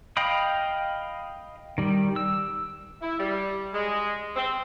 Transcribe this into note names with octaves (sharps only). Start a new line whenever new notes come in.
D#5 F5 G5 B5 D#6
D#3 G3
E6
E4
G3
G#3
C4